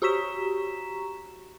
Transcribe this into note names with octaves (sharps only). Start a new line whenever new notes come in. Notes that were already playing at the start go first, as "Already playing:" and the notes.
F#4 G4 A#5 C#6 B6 E7